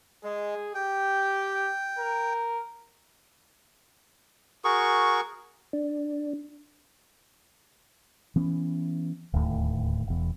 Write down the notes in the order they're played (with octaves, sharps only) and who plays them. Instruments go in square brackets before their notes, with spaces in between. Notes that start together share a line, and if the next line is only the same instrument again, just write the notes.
[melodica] G#3 [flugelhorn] G#4
[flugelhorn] G4 [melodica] G5
[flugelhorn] A#4
[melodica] F#4 G#4 A#4 C#6
[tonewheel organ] D4
[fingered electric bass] E3 B3 C#4
D1 D#2 A2
E1 E2